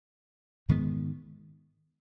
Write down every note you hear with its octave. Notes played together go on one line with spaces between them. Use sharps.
G#2 D#3 G#3 B3